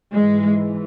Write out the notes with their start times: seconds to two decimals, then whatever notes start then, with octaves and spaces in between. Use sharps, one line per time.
0.15 G#2 E3 G#3